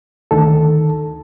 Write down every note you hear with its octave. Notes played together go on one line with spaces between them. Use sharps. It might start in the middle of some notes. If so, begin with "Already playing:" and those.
D2 D#3 A4